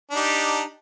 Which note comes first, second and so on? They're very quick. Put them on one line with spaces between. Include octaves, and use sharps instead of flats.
D4 D#4 G4